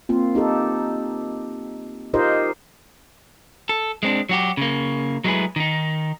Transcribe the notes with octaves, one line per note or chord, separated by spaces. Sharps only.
A#3 C4 F4
D#4 G4 A4
D#4 F4 G4 A#4 C5 D#5
A4
G#3 C4 D4
F#3 F#4 G4
C#3 A#3
F#3 G#3 A3 E4 G#4 B4
D#3 D#4